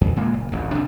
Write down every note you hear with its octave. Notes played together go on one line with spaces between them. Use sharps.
E2
A#2 G#3 A#3
F#1
D1 A1 E2
C3 D4